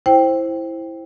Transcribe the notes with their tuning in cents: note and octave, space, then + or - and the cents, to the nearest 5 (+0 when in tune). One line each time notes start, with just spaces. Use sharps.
E4 +0 C5 +10 G5 +0